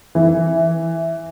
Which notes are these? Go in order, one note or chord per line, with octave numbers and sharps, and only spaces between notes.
E3